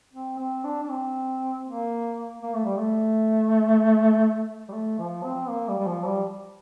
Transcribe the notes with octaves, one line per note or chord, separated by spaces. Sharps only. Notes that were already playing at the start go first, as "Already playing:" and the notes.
C4
C4
D4
D4
C4
A#3
A#3
A3
G3
A3
G3
A3
F3
C4
A#3
G3
G3
F3
G3